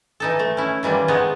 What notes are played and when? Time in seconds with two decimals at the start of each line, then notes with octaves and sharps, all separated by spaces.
0.20 E3 D#4 A4
0.39 A3
0.57 C#4 E4
0.83 D#3 E3 G3 A#3 F4
1.08 G#3 B3 C4 D#4 C#5 D#5